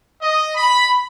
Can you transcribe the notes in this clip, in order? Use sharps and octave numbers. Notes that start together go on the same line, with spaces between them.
D#5
B5